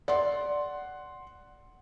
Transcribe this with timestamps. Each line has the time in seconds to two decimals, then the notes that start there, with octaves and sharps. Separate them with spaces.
0.08 D5 F#5 C6